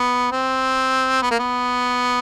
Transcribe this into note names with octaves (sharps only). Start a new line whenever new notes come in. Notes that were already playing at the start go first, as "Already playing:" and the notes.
Already playing: B3
C4
B3
A#3
B3